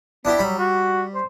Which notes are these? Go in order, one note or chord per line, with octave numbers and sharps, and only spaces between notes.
B3 D4 E4 G4
F#3 G3 B5
F#4
C5